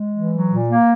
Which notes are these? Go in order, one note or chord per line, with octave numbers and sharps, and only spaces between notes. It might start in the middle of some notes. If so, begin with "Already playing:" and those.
Already playing: G#3
E3
F#3
A#2
A#3